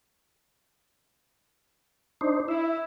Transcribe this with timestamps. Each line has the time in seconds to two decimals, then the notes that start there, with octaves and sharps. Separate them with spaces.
2.21 D4 D#4 C5
2.48 E4 E5